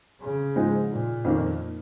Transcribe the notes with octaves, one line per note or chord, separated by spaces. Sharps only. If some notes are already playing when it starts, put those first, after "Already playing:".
C#3
G#2 F3 G#3 D#4
A#2
F2 D#3 A#3